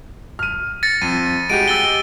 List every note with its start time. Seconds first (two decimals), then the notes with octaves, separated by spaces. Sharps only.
0.39 F6 D#7
0.83 A6 A#6 C#7
1.01 F2 D#7
1.50 G#3 F#4 G4 D7 D#7
1.68 E6 A6 G7